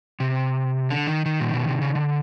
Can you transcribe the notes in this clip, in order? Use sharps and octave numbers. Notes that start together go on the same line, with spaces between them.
C3
D3
D#3
D#3
A#2
B2
C3
C#3
D3